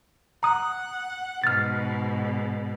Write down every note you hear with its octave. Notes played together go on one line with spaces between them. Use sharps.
F#5 A#5 D#6
G#2 B2 F6 A6